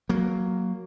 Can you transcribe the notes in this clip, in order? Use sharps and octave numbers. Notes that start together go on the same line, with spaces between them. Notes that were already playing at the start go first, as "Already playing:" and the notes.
F#3 A#3